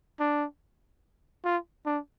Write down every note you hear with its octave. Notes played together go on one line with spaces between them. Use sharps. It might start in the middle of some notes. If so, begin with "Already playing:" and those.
D4
F4
D4